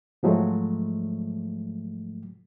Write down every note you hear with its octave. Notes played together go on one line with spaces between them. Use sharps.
G#2 F3 F#3 G#3 A3